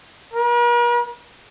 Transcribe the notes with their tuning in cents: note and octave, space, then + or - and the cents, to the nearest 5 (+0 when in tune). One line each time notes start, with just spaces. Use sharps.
A#4 +45